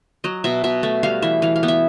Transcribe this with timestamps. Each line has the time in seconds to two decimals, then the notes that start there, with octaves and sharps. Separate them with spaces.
0.24 F#3 D#5
0.44 B2 E5
0.64 B2 E5
0.83 A3 E5
1.03 G3 F5
1.22 E3 E5
1.42 E3 F5
1.56 F5
1.63 B3
1.68 E5